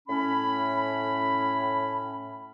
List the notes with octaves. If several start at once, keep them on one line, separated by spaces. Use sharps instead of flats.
A2 C#4 B5